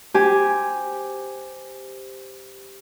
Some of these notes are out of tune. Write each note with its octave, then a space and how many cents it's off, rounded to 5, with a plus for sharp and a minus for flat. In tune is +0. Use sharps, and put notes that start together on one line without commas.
G4 +0 C5 -10 G#5 +0